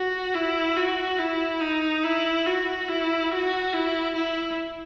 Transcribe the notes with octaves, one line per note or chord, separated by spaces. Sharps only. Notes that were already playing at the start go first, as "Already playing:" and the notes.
Already playing: F#4
E4
F#4
E4
D#4
E4
F#4
E4
F#4
E4
E4